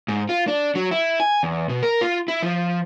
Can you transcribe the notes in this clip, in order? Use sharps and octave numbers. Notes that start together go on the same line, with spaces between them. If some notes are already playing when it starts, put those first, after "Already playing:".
G#2
F4
D4
F#3
E4
G#5
E2
B2
A#4
F4
E4
F3